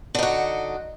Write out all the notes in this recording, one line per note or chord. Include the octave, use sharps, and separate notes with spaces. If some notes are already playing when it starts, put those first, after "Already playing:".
D3 D#4 F#4